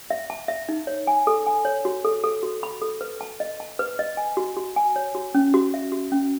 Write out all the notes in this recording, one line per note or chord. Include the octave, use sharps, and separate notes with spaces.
E5
A5
E5
D#4
C#5
G#5
A4
G#5
C#5
F#4
A4
A4
F#4
B5
A4
B4
A5
D#5
A5
B4
D#5
G#5
F#4
F#4
G#5
C#5
F#4
C#4
F#4
E5
F#4
C#4